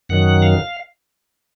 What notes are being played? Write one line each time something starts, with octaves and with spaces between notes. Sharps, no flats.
F#2 D#3 F#3 F#5
F5